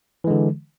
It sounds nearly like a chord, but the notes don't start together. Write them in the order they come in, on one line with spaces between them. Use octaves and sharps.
E3 G#3 D3